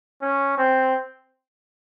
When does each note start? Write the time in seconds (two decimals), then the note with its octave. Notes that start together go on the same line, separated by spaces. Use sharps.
0.22 C#4
0.58 C4